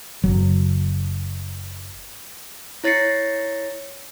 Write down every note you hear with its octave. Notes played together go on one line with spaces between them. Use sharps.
F#1 F#3
E4 C#5 A6 A#6 C7 C#7